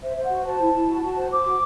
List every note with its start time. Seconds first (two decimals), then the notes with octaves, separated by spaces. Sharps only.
0.02 C5 E5
0.16 C5
0.23 F#5
0.31 F#4
0.45 C5 A5
0.60 E4
0.74 E4
0.88 F#4
1.03 F#4
1.17 C5
1.31 C5 D6
1.46 F#4